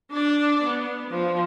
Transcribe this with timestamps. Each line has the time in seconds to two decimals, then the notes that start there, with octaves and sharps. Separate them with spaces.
0.12 D4 D5
0.64 B3
1.11 F3